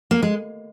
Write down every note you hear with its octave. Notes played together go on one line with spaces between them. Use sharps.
A#3
G#3